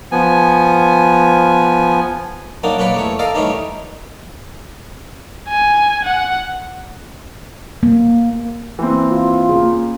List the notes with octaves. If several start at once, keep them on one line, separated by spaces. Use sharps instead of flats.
F3 B3 G#5
F#2 F#3 A#3 D4 D#4
A#3 C#4 B4 C#5 D5
E2 A3 C#5
A4 A#4 D5 D#5 F5
D#3 E3 G3 A3 C#4 D#4
G#5
F#5
A#3
E3 A#3 C4
F4
C#3 A#3